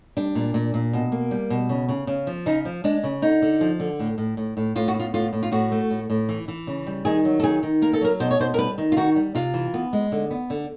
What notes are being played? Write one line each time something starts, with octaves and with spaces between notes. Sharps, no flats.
G3 D4
A#2
A#2
A#2
B2
A#3
G3
B2
C#3
C#3
C#3
F3
C#3 D#4
F3
G#3 D4
C#3
D3 D#4
D3
F3
D3
A2
A2
A2
A2
A2 F4
F#4
B3 F4
A2 F4
A2
F4
A2 F#4
A3
A2
A2
E3
E3
C#3
G3
D#3 G#4
F#3
A4
D#3 G#4
D#3
A#3 A#4
A4
F#3 A#4
B2 C5
C#5
B2 C5
A#4
G3 B4
D#3
F4
D#3 F#4
G3
C3 F4
E3
B3
G#3
D3
B3
D3